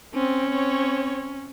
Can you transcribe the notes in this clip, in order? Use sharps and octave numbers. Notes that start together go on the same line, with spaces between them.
C4 C#4
C4 C#5